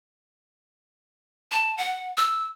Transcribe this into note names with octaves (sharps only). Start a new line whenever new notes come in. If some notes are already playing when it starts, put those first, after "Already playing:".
A5
F#5
E6